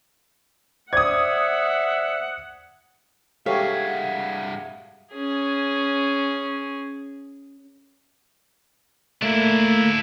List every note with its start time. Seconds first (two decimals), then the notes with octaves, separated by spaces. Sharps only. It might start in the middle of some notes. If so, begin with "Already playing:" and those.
0.93 C5 D5 E5 F#5 D6 D#6 G#6
3.46 G2 F#3 G#3 G4 A4 C#5 E5 F5
5.13 C#4 G#4
9.22 A3 A#3 D4 E4